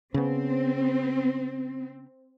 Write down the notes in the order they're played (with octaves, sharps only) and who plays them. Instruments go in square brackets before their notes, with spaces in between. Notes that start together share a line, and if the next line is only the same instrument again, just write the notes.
[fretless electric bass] C#3 B3 [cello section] C4